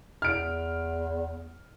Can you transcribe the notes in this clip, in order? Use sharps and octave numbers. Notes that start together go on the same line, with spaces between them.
E2 F6 D7